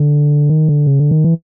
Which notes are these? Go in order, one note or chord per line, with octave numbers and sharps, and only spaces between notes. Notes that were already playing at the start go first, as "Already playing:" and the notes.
Already playing: D3
D#3
D3
C#3
D3
D#3
E3